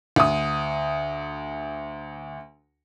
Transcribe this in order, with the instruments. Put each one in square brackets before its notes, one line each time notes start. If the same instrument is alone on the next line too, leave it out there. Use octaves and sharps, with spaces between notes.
[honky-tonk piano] D2 D#6